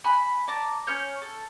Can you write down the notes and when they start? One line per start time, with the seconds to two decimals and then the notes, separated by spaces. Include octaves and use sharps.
0.04 G#5 B5 F#6
0.48 D5 A5 A#5 D6
0.87 C#4 C#5 F6 G6
1.22 A4